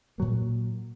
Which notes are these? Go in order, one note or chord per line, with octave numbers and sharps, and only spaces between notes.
A#2 F#3 A#3